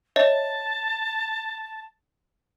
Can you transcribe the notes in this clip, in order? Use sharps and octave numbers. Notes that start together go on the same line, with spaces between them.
C#5 D#5 E5 A5